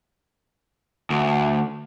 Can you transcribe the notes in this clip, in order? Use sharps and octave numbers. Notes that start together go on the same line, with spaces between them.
D2